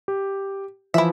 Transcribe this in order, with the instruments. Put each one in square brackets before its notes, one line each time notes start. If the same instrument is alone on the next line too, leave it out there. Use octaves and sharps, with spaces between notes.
[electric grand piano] G4
[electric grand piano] E3 F3 [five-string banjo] E4 E5